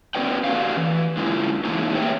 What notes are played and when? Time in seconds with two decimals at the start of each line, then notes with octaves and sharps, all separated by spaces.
0.15 B3 C#4 F#4 B4 D5 G5
0.44 A3 C#4 F#4 G4 D5 F5
0.77 E3
1.17 D3 G#3 C#4 E4 F4
1.64 E3 G#3 A#3 D#4 E4
1.95 A3 G4 B4 C#5 E5 G5